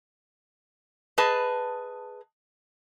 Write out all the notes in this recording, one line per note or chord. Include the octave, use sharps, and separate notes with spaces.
G#4 B4 D#5 A5